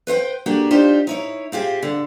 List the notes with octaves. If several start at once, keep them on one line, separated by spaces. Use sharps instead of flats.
B4 C5 F5 G5
A#3 D4 F#4 G4 A4
D4 D#4 F4 G4 C5
D#4 E4 C#5
C4 F4 G4 G#4
D3